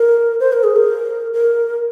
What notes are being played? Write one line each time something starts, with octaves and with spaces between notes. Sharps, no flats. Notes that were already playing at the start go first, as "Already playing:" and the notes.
Already playing: A#4
C5
A#4
G#4
A#4
A#4